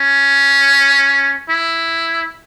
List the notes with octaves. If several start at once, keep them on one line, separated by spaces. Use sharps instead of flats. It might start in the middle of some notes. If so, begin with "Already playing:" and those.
Already playing: C#4
E4